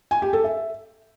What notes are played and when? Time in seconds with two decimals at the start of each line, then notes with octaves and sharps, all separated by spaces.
0.11 G#5
0.22 G4
0.33 A4
0.44 E5